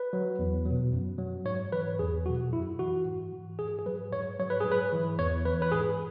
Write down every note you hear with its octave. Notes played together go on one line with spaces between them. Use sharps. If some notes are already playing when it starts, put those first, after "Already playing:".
Already playing: B4
F#3
E2
F#3
B2
F#2
F#3
G#2 C#5
E3 B4
E2 G#4
B2 F#3 F#4
F#2 E4
E3 F#4
G#2
E3
G#2 G#4
G#4
F#3 B4
G#2 C#5
F#3 C#5
B4
G#2 G#4
B4
E3
E2 C#5
E3 B4
B4
G#2 G#4